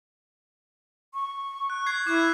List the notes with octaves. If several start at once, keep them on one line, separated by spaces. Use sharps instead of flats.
C#6
F#6
G#6 C7
E4 D6 F#6 G#6